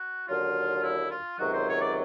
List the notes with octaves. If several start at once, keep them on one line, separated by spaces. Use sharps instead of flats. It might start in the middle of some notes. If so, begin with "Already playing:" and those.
Already playing: F#4
D#2 D3 F#3 F4
E4
F4
C#2 C3 D#3 F#3 F#4
C5
C#5
D5